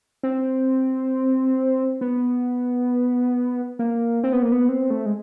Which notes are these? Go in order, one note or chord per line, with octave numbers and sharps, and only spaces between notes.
C4
B3
A#3
C4
B3
A#3
B3
C4
A3
G#3